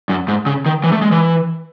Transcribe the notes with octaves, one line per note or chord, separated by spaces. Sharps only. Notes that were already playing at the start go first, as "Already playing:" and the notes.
F#2
G#2
C#3
D#3
E3
A3
G#3
E3